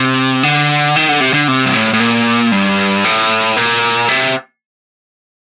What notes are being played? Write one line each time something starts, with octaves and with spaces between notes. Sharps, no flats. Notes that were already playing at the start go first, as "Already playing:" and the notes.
Already playing: C3
D3
D#3
D3
C3
D3
C3
G2
A2
A2
A#2
G2
A2
A#2
C3